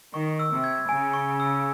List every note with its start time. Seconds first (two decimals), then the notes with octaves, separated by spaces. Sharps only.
0.14 D#3 C#6
0.39 E6
0.51 C3
0.64 G#6
0.89 C#3 G#5
1.13 C#6
1.40 E6